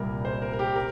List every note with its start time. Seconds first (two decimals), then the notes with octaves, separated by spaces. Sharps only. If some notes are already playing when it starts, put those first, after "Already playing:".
Already playing: C2 A#2 G3 A#4
0.25 C5
0.42 A#4
0.53 A#4
0.59 G4
0.76 A#4